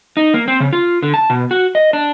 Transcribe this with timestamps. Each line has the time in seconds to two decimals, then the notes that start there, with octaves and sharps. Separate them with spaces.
0.17 D#4
0.34 A#3
0.48 C4
0.60 C#3
0.73 F4
1.02 D3
1.14 A5
1.30 B2
1.51 F#4
1.75 D#5
1.93 D4